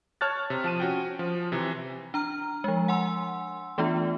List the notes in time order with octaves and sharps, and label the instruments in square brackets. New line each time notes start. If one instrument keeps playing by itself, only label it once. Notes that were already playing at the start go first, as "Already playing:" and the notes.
[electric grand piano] C#5 A5 F6 F#6 A6
C3
F3 A5 D#7
C#4 F#4 G5
F3
C3 E3
[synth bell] D4 A#5 F6
F3 G#3
F#5 G#5 C6 E6
E3 A3 B3 D4 F4